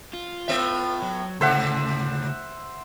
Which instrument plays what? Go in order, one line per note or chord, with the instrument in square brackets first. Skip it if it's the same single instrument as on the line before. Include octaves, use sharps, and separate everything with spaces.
[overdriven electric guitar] F4
[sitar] A2 B3 E5
[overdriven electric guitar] F#3
[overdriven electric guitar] D2 C#3 [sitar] G#2 A4 [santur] C5 E5 F#5